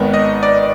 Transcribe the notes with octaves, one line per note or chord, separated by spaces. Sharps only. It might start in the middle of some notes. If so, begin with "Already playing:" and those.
Already playing: G#1 G#2 D#3 B3
D#5
D5